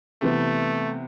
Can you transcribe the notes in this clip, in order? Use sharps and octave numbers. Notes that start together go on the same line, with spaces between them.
C3 E3 A3 B3